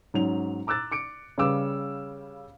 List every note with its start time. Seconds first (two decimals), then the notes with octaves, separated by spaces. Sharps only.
0.14 G#2 F#3 C#4 F7
0.67 A#5 D6 E6 F#6 A6
0.92 D6 C#7 D7
1.38 C#3 G3 B4 F5 D6 E6